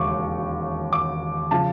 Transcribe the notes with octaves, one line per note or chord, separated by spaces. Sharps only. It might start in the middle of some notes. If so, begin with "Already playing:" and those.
Already playing: E1 D#2 C#3 C#6 D6
D6
C#3 F3 A5